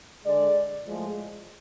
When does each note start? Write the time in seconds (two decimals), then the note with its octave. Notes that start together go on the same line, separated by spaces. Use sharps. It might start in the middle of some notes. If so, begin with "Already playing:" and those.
0.24 D3 G#3 D5
0.85 A2 F3 G#3